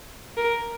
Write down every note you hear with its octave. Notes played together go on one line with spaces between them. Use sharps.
A#4